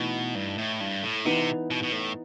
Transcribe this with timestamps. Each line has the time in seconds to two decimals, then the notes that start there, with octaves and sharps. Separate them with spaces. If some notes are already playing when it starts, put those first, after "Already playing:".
Already playing: B2 E3 A3 D#4
0.35 G2
0.58 A2
0.80 G2
1.03 A2
1.25 C3 E3 B3 D#4
1.71 B2
1.83 B2
1.92 A2